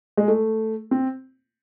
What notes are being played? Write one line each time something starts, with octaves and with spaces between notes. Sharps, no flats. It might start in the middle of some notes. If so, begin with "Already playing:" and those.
G#3
A3
C4